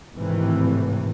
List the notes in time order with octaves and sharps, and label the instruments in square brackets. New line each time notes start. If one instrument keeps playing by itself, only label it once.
[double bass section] G#1 A2 C3 D#3 E3